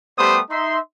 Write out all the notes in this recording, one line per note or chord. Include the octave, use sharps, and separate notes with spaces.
G3 A3 B3 G4 C5 D#6
D#4 E5 C6